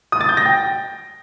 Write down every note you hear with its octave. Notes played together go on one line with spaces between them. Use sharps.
D#6
A6
G6
A#6
G5